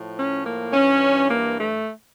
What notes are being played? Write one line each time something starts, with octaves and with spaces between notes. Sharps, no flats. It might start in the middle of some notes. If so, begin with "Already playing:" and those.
Already playing: A2 F3
C#4
A#3
G2 E3 C#4
A#3
A3